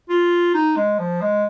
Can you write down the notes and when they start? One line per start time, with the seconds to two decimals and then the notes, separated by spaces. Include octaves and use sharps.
0.09 F4
0.54 D#4
0.76 G#3
0.99 F3
1.22 G#3